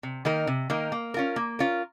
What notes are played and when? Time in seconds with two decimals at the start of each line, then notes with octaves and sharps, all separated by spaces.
0.03 C3
0.25 D#3 A#3 D#4 A#4
0.47 C3
0.70 D#3 A#3 D#4 A#4
0.92 A#3
1.14 C#4 F4 A#4
1.36 A#3
1.59 C#4 F4 A#4